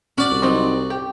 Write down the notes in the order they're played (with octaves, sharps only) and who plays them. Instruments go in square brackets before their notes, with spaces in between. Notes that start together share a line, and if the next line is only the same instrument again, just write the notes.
[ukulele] C#4 [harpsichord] F#4 D5
[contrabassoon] C2
[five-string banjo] F#3 C4 D#4
G4